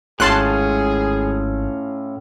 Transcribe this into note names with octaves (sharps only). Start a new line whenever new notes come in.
G#1 A2 C#4 F4 G#4 A5 C6 F#6